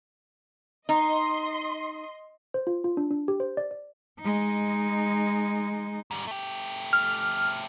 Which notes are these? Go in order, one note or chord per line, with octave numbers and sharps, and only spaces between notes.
D#4 D#5 C6
C5
F4
F4
D4
D4
G4
C5
D5
D5
G#3 D#4
G#2 G3
A3 G4
F6